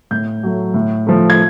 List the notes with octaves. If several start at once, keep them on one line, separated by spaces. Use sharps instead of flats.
A2 G6
F#3 A3
A2
F3 A3
G#6